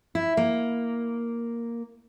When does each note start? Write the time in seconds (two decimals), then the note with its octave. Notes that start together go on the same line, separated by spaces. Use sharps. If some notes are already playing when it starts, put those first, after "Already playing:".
0.15 E4
0.37 A#3